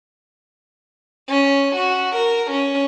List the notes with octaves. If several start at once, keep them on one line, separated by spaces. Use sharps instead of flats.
C#4
F#4
A#4
C#4